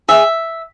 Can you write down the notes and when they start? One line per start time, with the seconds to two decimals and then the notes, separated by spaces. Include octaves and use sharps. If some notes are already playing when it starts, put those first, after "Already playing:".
0.08 G#4 E5